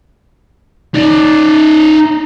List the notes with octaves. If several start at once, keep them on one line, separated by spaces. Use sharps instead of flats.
D#4 D5